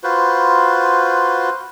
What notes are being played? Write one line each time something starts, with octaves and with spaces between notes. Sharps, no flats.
F4 F#4 B4 C5